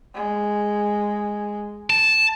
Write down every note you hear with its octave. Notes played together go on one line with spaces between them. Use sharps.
G#3
A5